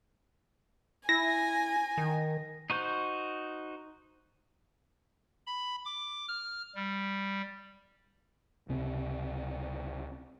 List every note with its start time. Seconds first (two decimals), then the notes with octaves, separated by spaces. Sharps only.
1.09 E4 G#5 A#6
1.98 D#3
2.70 D#4 F#4 C5 G6
5.47 B5
5.86 D6
6.29 F6
6.75 G3
8.69 C#2 C3 C4